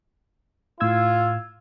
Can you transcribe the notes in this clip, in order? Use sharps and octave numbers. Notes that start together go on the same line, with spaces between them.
A2 F4 E6 G#6